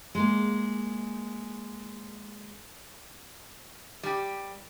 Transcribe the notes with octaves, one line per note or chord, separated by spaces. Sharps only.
G#3 A#3
G3 G4